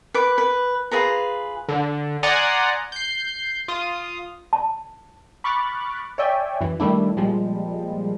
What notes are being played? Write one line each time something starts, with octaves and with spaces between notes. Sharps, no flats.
B4 D6
B4
F4 G#4 B4 A#5
D3
D5 F#5 G#5 A#5 C6 D#6
G6 C7
F4 D#6
A5
B5 C#6 D6 F6 F#6 A6
C#5 D5 E5 G5 G#5
F#2 E3
D#3 G3 A3 D4 E4
A#2 F3 G3 G#3